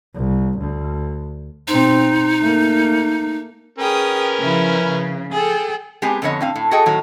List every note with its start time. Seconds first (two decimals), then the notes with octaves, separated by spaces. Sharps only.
0.15 C2
0.59 D2
1.68 B2 C4 D#4
2.40 A3 A#3
3.78 C#4 G#4 A#4 B4 G5 D#6
4.40 C#3 F3 E4
4.87 C#3
5.32 G#4 A4 G5
6.02 G#3 B3 C4 G4 G#5
6.22 F2 D3 B3 C#5 D#5
6.41 A2 C4 F5
6.56 A2
6.71 F#4 G#4 A4 D#5 G5
6.86 A2 D#3 F#3